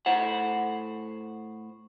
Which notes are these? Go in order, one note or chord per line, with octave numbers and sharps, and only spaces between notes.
A2 C5 F#5